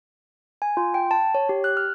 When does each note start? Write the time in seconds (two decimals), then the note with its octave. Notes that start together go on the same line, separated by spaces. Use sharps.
0.62 G#5
0.77 F4
0.94 G5
1.11 A5
1.35 C#5
1.49 G4
1.64 F#6
1.77 F6